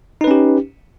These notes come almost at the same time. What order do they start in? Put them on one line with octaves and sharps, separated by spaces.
D#4 B4 C#4 G4